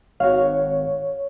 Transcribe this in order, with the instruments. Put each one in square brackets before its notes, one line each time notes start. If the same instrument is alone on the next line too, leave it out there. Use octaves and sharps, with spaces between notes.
[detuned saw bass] G#1 [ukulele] F#4 F5 [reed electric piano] C#5